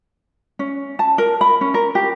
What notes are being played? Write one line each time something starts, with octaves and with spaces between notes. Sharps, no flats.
C#4
A5
A#4
B5
C#4
A#4
G4